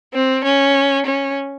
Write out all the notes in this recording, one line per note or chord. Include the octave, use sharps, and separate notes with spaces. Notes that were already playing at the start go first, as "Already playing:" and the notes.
C4
C#4
C#4